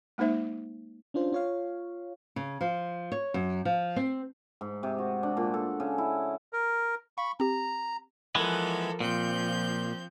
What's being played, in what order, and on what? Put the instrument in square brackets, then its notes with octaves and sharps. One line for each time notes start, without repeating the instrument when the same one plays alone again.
[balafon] G#3 A#3 D#4 C5 E5
[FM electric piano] C#4 D4 F4 C5
F4 C#5 F5
[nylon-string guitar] C#3
F3
C#5
F#2
F3
C4
[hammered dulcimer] G#2
C3
F#4
D4
A#2
A4
C#3
E4
[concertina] A#4
[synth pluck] F5 [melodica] B5 C#6
[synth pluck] C4 G4 [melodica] A#5
[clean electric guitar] E3 G#3 B3 [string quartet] F3 A4 A#4
[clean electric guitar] A#2 [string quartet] F3 C4 G6